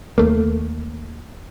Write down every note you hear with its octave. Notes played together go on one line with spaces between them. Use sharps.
D#2 A3 A#3